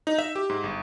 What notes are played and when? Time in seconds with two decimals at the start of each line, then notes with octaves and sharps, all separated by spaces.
0.07 D#4
0.19 E5
0.36 G4
0.50 G#2
0.64 G1